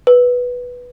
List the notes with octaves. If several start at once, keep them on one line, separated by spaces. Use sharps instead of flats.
B4